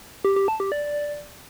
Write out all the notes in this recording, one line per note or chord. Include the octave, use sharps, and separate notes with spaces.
G4
G4
A5
G4
D5